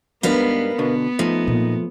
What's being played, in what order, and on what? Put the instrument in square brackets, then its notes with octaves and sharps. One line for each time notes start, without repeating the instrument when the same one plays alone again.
[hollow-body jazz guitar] G#2 G3 D4 [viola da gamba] B3 [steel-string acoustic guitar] A#4 B4 F5
[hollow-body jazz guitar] B2 D3 [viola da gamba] B3
[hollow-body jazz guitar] F3 A3 [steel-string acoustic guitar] D#4
[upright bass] A#2